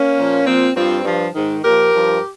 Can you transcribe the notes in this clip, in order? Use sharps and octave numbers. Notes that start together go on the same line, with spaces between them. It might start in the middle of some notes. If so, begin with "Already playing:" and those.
Already playing: A#3 C#4
A#2 F3
A#2 F3 C4
G2 F3 C4
G2 F3
G#2 D#3
A#2 F3 G4 A#4
G2 F3